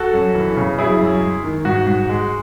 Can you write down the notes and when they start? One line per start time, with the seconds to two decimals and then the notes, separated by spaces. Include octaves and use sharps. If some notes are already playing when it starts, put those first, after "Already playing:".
Already playing: F#4 A4
0.14 F#2
0.35 E3
0.57 C#3
0.78 F#2 E4 G#4
1.01 F#2
1.22 G#3
1.44 D#3
1.65 G#2 F#4
1.87 G#2
2.09 G#3